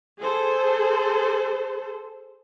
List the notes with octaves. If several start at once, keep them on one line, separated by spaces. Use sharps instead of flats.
G#4 A4 C5